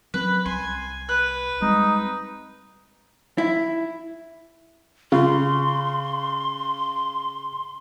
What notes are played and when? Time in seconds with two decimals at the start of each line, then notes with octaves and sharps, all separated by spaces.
0.14 F#3 C4 C#4 B4
0.46 C2 G#5 C6
1.09 B4 F#6
1.62 G3 G#3 C4 D#4
3.38 E4
5.12 C#3 F4 C6